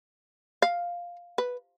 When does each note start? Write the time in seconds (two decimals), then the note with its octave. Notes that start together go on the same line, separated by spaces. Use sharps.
0.62 F5
1.38 B4